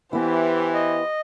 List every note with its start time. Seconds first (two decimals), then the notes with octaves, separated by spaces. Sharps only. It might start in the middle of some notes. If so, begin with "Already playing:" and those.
0.13 E3 B3 E4 G4 C5
0.74 D#5